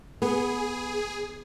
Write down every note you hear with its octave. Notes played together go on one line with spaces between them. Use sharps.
B3 G#4